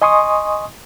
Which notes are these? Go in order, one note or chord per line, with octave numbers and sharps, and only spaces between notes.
D#5 G#5 C6 C#6 D#6